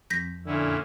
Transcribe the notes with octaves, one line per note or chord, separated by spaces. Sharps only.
F2 G6 A#6 B6
A#2 D3 C#4 E4